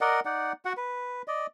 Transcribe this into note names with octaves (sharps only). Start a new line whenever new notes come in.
A#4 D5 D#5 F#5
D#4 D5 F#5
F#4 F#5
B4
D5 D#5